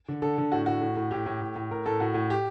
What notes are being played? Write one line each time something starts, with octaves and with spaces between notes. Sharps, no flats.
D3
D3 A4
D3
A2 F#4
A2 F#4
A2
A2
A2 G4
A2
A2
A2
A2 A#4
A2 A4
A2 F#4
A2
G4